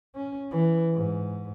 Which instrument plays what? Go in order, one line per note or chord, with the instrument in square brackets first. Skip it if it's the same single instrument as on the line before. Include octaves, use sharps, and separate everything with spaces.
[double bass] C#4
E3
G#2